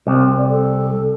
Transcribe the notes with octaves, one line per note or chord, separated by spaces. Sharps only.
C2 C4
D5
A4